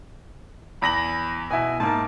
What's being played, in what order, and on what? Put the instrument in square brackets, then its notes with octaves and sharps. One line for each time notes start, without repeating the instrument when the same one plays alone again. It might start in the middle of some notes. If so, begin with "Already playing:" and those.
[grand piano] E2 A#6 F#7 [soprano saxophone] B5
[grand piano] B2 E4 [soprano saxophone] G#5
[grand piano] G#2 A#3 [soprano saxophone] A5